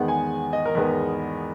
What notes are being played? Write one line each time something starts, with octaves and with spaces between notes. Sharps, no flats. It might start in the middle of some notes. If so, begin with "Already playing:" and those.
Already playing: E2 D#3 G#3 B3 F#5
G#5
D#5
A#4
E2 D#3 G#3 B3 B4